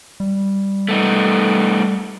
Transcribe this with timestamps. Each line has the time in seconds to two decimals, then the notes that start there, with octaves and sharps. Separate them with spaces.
0.20 G3
0.89 A3 B3 D#4